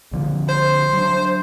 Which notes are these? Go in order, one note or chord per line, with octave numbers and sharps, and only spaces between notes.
A#1 D3 F3
C5 C6 G6
F#3 D4